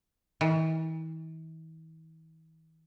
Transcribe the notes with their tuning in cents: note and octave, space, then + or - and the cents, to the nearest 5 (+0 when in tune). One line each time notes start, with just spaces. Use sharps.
E3 -45